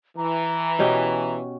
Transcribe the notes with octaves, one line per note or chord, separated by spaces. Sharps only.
E3 A#5
B2 C#4 G4